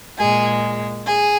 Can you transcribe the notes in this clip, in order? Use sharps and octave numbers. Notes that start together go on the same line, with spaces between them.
A#2 G#3 G#4
G#4